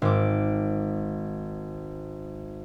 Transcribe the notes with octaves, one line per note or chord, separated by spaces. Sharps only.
G#1 D6